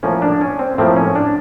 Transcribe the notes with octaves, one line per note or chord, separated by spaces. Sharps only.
A2 F3 A#3 C#4
D4
C#4
C4
A2 F3 A#3 C4
C#4
D4